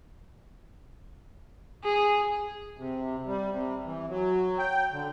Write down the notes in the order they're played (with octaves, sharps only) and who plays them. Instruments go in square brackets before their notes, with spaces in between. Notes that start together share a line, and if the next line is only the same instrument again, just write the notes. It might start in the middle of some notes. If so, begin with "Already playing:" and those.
[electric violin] G#4
[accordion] C3
G3
C3
E3
F#3
G5
D3